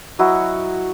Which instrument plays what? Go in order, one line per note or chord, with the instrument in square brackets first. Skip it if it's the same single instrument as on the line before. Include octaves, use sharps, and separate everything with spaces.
[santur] F#3 E4 F#4 D#5